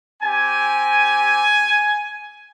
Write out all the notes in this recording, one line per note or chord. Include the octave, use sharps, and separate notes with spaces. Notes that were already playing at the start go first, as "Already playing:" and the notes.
C4 G4 G#5